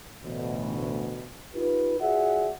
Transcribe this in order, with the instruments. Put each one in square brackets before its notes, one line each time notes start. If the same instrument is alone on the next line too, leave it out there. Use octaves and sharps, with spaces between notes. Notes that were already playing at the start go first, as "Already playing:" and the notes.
[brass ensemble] A1 D2 B2
D#4 F4 G4 B4
F4 F#4 G#4 D5 E5 F#5